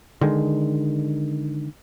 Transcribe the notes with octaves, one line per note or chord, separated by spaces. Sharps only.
D3 D#3 G#3